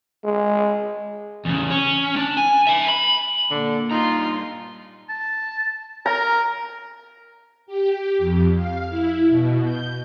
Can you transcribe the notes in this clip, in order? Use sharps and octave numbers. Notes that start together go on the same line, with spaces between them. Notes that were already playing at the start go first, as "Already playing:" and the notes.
G#3
E2 C#3
C#4
D4
G#5
E5 G#5
B5
A#2 D3
G2 D#4 F4 A#5 C6
A5
A#4 A#5
G4
F2
F5
E4
B2
G6